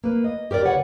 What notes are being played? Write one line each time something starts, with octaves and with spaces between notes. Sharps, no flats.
A#3 B4
D#5
G4 A#4 C#5 D5
D2 C#3 B4 C#5 F#5